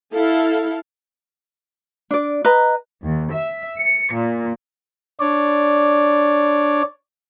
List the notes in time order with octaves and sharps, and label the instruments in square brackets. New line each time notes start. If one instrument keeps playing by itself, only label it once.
[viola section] E4 A4 F5
[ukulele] D4 D5
B4 D#5 A#5
[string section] D#2
E5
C#7
A#2
[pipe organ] D4 C#5 D5